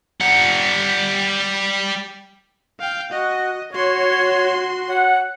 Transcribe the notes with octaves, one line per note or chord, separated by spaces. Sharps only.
G3 F#5
F5 G5
F#4 D#5
F#4 C#5 C6
F#4 C#5 F#5